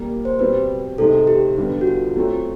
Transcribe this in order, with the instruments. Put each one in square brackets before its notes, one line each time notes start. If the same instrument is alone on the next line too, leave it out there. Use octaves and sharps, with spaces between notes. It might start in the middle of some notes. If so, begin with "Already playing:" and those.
Already playing: [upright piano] A#2 G3 A#3
[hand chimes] C5
[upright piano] B2 G3 C4 [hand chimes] B4
[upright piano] C3 D#3 G#3 [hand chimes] A4
[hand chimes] G4
[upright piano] G2 D3 G3 B3
[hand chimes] F#4
F4
[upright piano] F#3 A3 C4